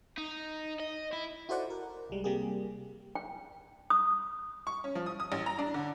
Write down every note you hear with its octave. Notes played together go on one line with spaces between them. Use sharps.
D#4
D#5
E4
E4 F#4 A4 C5 D5 F#5
A#4
C2 G3 G#3
C3 G3 A#3 G4 G#4
G5
D#6
C#6
C#4
F3
D#6
D#6
A1
A#5
D4
D3